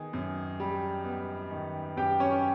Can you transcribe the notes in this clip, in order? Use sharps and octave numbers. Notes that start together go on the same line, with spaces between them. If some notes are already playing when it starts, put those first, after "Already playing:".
Already playing: D#3 B3 G#4
F#2
G3
B3
D#3
F#2 G4 G5
C#4 C#5